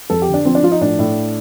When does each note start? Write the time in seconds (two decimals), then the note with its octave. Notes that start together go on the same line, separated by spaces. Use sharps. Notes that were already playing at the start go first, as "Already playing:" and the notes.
0.10 F2 A4
0.22 G4
0.28 D3
0.34 D4
0.45 F3 C4
0.55 D4
0.63 F3 F4
0.72 D#4
0.81 A2 D4
0.99 A2